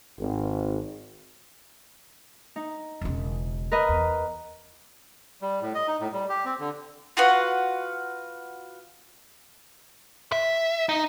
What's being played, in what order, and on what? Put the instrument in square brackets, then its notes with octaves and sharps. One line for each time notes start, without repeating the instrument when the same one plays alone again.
[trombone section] G#1
[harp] D#4
[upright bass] E1 C#3
[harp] A#4 B4 D#5
[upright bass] E2
[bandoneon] G3
A2
D#5
D#4
A2
G3
G4
C4
D3
[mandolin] F4 F#4 B4 F#5
[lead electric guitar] E5
D#4